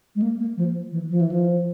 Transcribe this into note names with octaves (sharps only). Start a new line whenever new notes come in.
G#3
A#3
A#3
F3
E3
F3
E3
F3